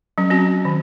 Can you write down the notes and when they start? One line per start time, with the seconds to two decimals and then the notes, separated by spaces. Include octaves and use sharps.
0.18 F#3 C#4
0.30 C4 C#4 F#4
0.65 D#3